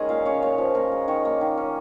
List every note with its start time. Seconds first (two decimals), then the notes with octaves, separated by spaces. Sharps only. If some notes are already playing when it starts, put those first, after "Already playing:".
Already playing: D#3 G#3 C#4 A#4 G#5 A#5
0.09 A#2 F5
0.25 C#4 C#5
0.42 A#2 C#5
0.58 F3
0.75 A#2 A#4
0.92 G#3
1.08 D#3 C#5
1.25 A#3
1.41 D#3
1.58 C#4